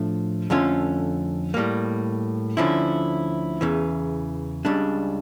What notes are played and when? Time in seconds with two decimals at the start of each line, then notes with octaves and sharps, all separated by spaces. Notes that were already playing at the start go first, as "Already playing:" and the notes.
Already playing: A2 F3 A3 D4
0.50 F2 D3 A3 C#4 F4
1.54 A2 G3 A#3
2.57 D2 D3 F3 C#4 E4
3.61 E2 C#3 E3
4.65 C#2 C#3 G3 D4